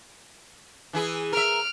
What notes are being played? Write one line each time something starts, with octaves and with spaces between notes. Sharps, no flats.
E3 E4 G#4
A#4 E5 F6 D7